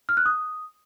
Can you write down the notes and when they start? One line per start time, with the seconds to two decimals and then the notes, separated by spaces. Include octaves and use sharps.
0.09 F6
0.17 F#6
0.26 D#6